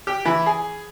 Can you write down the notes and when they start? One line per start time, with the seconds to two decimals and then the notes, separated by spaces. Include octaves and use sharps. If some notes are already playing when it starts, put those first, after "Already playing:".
0.07 G4
0.25 E3
0.46 G#4